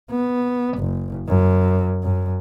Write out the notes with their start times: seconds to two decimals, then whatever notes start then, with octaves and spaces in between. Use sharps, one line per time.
0.11 B3
0.78 F#1
1.28 F#2
2.04 F#2